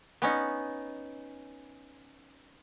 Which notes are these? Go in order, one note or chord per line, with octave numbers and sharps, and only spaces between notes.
B3 C#4 D#4